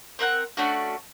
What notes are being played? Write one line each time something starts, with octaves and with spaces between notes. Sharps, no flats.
C4 A#4 F#5 F#6
A3 C#4 D4 F#4